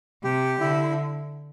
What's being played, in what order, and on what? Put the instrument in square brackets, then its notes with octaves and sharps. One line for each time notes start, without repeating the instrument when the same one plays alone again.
[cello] C3 [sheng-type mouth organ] G4
[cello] D3 [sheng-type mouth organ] E4